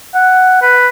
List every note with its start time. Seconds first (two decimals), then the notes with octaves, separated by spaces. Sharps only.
0.14 F#5
0.62 B4